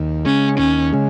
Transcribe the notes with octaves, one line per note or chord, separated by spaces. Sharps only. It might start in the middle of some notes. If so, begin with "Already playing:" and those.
Already playing: D#2
C#3 G#3 C#4
D#2 C#4
C#3 G#3